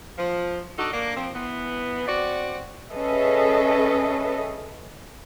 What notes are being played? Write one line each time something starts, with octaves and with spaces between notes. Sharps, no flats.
F3
D4 D#4 F#4 A4
A#3 D4
F3 C4
E3 B3
C4 F#4 D5
C#4 G#4 A4 B4 D#5 E5